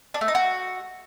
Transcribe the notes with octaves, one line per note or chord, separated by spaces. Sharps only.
D4
A3
D#4
F#4